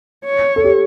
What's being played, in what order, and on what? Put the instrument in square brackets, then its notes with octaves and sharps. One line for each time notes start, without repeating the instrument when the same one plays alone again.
[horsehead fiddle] C#5
[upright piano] A4
G4